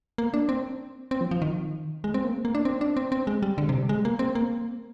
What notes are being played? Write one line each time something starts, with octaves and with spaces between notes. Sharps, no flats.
A#3
D4
C4
C4
F3
F3
D#3
G#3
C4
A#3
A#3
D4
C4
D4
C4
C4
G#3
G3
D3
C3
G3
G#3
A#3
C4
A#3